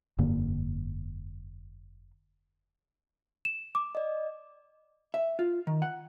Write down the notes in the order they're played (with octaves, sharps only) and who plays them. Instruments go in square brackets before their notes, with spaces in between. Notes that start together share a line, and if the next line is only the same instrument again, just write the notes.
[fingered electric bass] F1 G2 D3 A#3
[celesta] E7
D6
[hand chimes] D5 D#5
[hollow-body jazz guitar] E5
F4
D#3
F#5